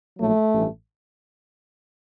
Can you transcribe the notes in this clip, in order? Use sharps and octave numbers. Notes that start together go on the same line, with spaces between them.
A#1 A2 F#3 A3
A1 G2 E3